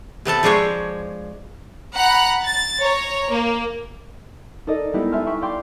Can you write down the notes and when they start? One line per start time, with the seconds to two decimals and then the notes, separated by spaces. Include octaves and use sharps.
0.25 C3 B3 A4 A5
0.43 F3 G#3 D4 C5 C#5
1.95 F#5 A#5 B5 F#6
2.42 A6
2.79 C#5 A#5
3.31 A#3
4.67 D#4 A4 A#4 D5 D#5
4.93 G3 G#3 B3 D#4 E4 G4
5.12 E5 G#5 A5 C6 F6
5.27 E5 G5 B5 C#6
5.41 D5 F5 G5 C6 D6